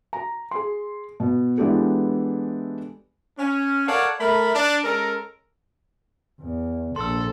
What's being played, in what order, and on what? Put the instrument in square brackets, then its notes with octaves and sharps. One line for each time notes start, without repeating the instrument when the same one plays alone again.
[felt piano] A#5
G#4 C6
B2
E3 G#3 B3 D4 G4 A4
[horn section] C#4
A4 A#4 C#5 D5 F5 F#5
A3 A#4 B5
D4
G#3 C#4 A4 A#4
[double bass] E2
[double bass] A#1 [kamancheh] A4 [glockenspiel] C6 E6